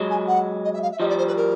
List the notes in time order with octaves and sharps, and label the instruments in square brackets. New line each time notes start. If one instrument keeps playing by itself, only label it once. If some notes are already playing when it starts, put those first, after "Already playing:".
Already playing: [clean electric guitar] F#3 G#3
[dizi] G#5
F#5
D#5
E5
F5
E5
[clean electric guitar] F3 G3 [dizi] D#5
[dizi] D5
C5
B4
A#4